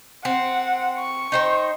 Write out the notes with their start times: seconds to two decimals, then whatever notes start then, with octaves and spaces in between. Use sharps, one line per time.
0.25 C4 F#5
0.98 C#6
1.32 D#4 C5 G5